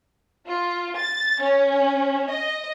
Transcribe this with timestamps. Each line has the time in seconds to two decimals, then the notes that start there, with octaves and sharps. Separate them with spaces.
0.47 F4
0.98 A6
1.43 C#4
2.31 D#5